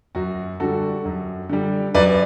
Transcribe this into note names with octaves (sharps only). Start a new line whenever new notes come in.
F#2 F#4
D3 G3 F#4 A4
F#2
D3 G3
F#2 B4 D5